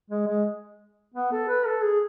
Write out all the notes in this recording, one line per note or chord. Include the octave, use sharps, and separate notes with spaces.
G#3
G#3
B3
A4
B4
A4
G#4